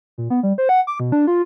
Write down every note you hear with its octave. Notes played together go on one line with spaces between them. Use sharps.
A#2
B3
G3
C5
F#5
D6
B2
D4
F4